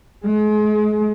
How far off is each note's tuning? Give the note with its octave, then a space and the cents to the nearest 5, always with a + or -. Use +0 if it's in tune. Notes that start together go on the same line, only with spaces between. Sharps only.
G#3 +35